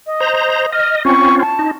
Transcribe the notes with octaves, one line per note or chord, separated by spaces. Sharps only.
D#5
C5 A#5
D#5 F6
C4 C#4 F4 C#6
A5
D#4